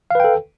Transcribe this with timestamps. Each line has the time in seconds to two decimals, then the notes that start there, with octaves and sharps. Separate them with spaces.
0.11 F5
0.15 B4
0.20 G5
0.24 A4